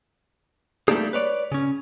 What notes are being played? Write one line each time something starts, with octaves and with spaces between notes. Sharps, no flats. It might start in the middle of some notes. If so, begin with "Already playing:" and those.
G3 A3 A#3 D4 D#4 G#4
B4 C#5 D5
C#3 C#4